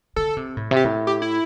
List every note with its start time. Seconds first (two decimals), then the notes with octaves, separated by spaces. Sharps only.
0.16 D3 A4
0.37 C3
0.57 A2
0.71 C3
0.76 G4
0.85 A2
1.07 G4
1.22 E4